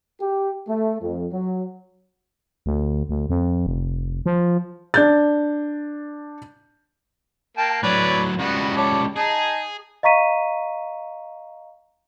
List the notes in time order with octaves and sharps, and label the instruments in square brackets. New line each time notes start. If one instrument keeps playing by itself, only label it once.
[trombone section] G4
A3
F2
F#3
[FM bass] D2
D2
F2
F1
F3
[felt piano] D4 G6 A6
[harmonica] A#3 G5 A5
[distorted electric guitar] A2 F#3 [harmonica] B4 C#5 D5
[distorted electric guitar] C#2 G3 [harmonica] B3 F#4
[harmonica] C#5 A5 D6
[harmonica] D#4 A5 [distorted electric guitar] G#4
[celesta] D#5 F5 A#5 C#6 B6 D#7